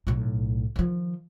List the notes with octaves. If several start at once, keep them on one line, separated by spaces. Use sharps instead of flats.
B1 A2
D#3 F3